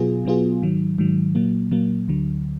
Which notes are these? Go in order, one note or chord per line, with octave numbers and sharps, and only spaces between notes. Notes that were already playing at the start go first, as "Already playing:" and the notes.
Already playing: B2 F#3 B3 F4 G#4
B2 F#3 B3 F4 G#4
G#2 D#3 F#3
G#2 D#3 F#3
A#2 F#3 A#3
A#2 F#3 A#3
D2 D3 F#3